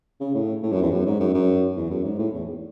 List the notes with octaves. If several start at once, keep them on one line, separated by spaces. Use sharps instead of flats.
C#3
A2
A2
F#2
E2
F#2
G#2
F#2
F#2
E2
F#2
G#2
A2
E2